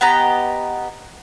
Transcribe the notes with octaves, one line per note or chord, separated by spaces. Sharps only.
B3 G4 D#5 A#5